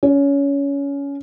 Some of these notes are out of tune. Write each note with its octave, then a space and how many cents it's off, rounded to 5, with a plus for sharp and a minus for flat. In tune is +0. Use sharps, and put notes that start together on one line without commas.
C#4 +20